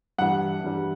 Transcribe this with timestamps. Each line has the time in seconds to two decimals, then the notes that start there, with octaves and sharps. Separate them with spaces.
0.18 G2 E3 G3 F#5
0.64 G2 E3 G3